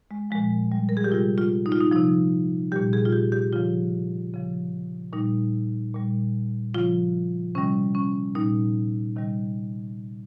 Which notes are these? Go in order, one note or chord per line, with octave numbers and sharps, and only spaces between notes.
G#3
A#2 F3 G#3
G3
A#4
G#4
G4
C3 G3 F4
F4
D#4
F4
D#4
C3 F3 D#4
A#2 G3 G4
G#4
F4
G4
G4
C#3 F3 F4
C#3 F3
A#2 G3 D#4
A#2 G3
C#3 F3 F4
C3 D#3 G3 C#4
C#4
A#2 G3 D#4
C3 D#3 G3